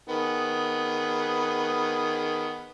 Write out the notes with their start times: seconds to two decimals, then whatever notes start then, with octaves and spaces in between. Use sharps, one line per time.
0.09 D#3 B3 G#4